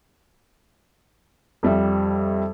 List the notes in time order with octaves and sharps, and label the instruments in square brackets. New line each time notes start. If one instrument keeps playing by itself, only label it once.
[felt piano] F2 G3 E5